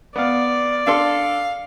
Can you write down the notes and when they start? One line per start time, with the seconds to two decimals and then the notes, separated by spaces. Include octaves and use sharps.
0.16 B3 D5 F5
0.87 D4 A4 F5 C6